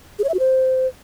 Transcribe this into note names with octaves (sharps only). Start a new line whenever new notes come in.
G#4
C#5
E5
F#4
C5